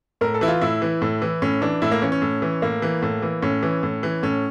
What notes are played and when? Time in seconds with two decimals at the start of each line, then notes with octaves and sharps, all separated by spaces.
0.21 A2 A#4
0.34 A4
0.41 E3 E4
0.48 F4
0.61 A2 E4
0.82 E3
1.02 A2
1.22 E3
1.42 A2 C#4
1.62 E3 D4
1.82 A2 E4
1.91 A#3
2.02 E3 C#4
2.12 C#4
2.22 A2
2.42 E3
2.62 A2 A#3
2.82 E3
3.02 A2
3.22 E3
3.42 A2 C#4
3.63 E3
3.83 A2
4.03 E3
4.23 A2 C#4